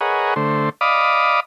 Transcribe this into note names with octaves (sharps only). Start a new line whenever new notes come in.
G#4 A#4 B4 C#5 D#5 F#5
D3 A3 C5
D5 D#5 F5 B5 D6 D#6